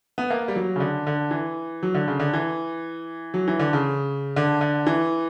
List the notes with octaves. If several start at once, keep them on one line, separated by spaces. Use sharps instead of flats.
B3
A#3
G3
F#3
C#3
D3
D3
E3
F#3
D3
C#3
D3
E3
F#3
E3
D3
C#3
D3
D3
E3